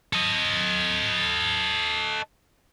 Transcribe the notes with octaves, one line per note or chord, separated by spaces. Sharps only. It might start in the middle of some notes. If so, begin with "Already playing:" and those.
A4 D#5